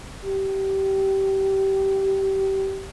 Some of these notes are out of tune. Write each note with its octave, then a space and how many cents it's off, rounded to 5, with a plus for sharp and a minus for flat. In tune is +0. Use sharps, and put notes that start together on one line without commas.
G4 -20